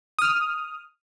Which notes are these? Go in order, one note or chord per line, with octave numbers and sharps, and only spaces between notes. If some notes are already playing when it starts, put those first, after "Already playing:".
D#6 F6